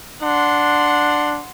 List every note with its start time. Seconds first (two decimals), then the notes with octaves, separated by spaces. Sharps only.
0.23 D4 F#5 C6